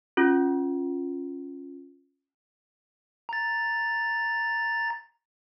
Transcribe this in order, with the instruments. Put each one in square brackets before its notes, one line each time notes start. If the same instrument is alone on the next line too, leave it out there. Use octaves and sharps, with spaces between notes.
[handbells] C#4 F4
[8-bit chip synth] A#5 A6